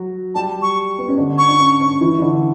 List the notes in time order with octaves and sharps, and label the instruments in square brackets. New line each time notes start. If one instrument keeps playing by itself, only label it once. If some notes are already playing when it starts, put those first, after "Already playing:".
Already playing: [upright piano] F#3 F#4
[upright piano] G3 G4 [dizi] A5
[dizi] C#6
[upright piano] B3
C#4
D3 D4
[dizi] C#6
[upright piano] D4
C#4
C#4
E3 E4
E4
D3 D4